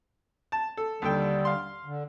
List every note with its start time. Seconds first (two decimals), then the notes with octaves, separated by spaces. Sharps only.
0.52 A5
0.77 A4
1.02 D#2 D3 G3 A4 G5
1.45 F5 C6
1.85 D3